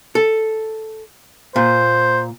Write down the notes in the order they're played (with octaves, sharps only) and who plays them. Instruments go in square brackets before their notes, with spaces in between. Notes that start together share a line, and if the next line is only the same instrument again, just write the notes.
[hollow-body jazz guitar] A4
[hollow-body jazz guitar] A#2 [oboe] C5